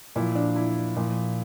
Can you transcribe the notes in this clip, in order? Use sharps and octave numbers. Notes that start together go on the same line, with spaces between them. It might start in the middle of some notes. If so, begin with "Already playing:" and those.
A#2 F3 E4
D4
E4
A#2 F3